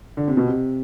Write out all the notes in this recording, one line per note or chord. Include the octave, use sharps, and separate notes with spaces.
D3
C3
B2
C3